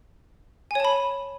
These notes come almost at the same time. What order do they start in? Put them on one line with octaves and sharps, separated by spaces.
G#5 C#5 A5 B5